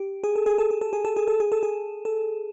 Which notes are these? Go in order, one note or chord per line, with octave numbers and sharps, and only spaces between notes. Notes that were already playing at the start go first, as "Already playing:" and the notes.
Already playing: G4
G#4
A4
G#4
A4
G#4
A4
G#4
A4
G#4
A4
G#4
A4
G#4
A4